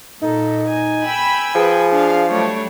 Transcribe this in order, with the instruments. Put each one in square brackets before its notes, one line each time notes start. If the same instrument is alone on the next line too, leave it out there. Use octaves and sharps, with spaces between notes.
[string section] A#2 [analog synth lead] D#4 [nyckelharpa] A4
[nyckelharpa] G#5
[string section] G5 B5 E6
[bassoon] F3 [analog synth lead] G#4 [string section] B4 G5
[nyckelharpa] D4 [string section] F5
[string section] F#3 G3 D4 [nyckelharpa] A3 C#5